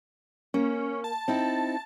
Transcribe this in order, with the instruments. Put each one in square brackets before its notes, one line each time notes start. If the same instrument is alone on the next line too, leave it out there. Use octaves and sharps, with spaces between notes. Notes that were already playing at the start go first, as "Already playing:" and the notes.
[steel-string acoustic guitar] A#3 [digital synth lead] C#4
[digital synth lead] A5
[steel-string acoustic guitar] C4 D#4 E4